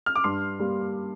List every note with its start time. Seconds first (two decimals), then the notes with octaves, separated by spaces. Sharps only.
0.06 F6
0.15 D6
0.24 G2 C6
0.60 G3 A#3